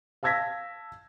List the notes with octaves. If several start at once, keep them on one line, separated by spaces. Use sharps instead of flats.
F5 A5 E6 G#6 A#6 B6